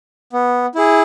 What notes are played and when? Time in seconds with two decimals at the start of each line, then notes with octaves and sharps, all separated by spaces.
0.33 B3
0.75 E4 G#4